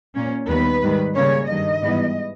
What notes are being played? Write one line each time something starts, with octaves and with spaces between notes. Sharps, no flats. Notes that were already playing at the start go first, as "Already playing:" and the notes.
A#2 A#3 C#4
D#2 D#3 G3 B3 B4
G#2 D#3 G3
C#3 G3 A#3 C#4 C#5
G2 D#3 G3 D#5
G#2 E3 G3 B3